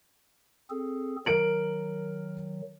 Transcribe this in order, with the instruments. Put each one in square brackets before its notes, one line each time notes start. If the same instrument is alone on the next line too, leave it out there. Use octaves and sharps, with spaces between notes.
[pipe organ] C4 G#4 A4
[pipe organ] D#3 F#3 [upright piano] A#4 D7 F#7